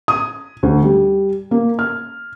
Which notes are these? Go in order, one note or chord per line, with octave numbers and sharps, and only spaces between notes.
D#6
D2
G3
A#3
F6